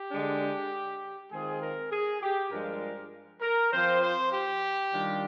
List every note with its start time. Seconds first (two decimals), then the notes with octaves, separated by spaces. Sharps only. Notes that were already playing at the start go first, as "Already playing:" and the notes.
Already playing: G4
0.10 D3 G#3 D4
1.31 D#3 G#3 C4 F4 G#4
1.61 A#4
1.91 G#4
2.22 G4
2.51 G2 F3 G#3 D4 F4 A#4
3.41 A#4
3.72 F3 C4 F4 C5
4.02 C5
4.32 G4
4.92 D#3 G3 D4 F4